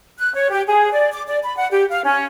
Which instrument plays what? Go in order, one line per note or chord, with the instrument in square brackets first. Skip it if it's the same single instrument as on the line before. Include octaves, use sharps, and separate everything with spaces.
[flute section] F#6
C#5
G4
G#4
D5
D6
D5
B5
F#5
G4
F5
C#4